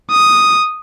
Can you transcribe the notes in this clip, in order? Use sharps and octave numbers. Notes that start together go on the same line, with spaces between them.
D#6